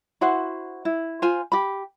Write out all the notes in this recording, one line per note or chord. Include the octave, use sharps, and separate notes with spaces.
E4 F#4 C5 F#5
E4
F4 C5 G#5
G4 B5